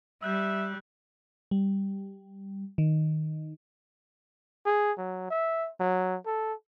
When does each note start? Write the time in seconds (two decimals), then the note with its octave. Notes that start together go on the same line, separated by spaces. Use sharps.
0.23 G3 E5 E6 F#6 G6
1.51 G3
2.78 D#3
4.66 G#4
4.98 F#3
5.30 E5
5.80 F#3
6.26 A4